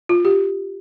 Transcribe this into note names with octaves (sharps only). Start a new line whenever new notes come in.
F4
G4